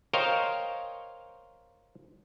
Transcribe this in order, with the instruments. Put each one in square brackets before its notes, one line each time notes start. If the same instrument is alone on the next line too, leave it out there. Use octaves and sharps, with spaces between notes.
[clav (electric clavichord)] A#4 C5 C#5 D#5 F5 G5